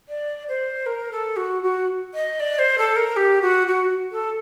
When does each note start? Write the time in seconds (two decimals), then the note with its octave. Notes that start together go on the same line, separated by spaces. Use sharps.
0.08 D5
0.48 C5
0.86 A#4
1.11 A4
1.36 F#4
1.62 F#4
2.13 D#5
2.39 D5
2.58 C5
2.78 A4
2.96 A#4
3.16 G4
3.41 F#4
3.67 F#4
4.11 A4